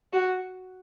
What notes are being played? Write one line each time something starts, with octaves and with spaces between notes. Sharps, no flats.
F#4